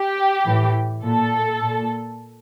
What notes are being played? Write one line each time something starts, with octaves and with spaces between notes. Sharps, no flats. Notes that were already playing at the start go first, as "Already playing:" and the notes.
Already playing: G4
A2 E3
A#2 A4
A#2